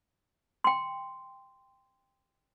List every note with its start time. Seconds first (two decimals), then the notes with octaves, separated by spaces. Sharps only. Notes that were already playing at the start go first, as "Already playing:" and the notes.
0.64 G5 C6